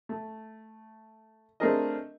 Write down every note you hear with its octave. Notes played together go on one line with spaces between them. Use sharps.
A3
A3 C4 D4 G#4 A#4 D#5